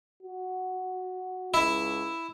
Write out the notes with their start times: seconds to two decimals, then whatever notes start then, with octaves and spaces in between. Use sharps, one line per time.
0.23 F#4
1.54 C#2 E4